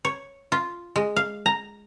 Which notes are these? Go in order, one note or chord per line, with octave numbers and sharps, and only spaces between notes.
C#5
F4
G#3
F5
A#5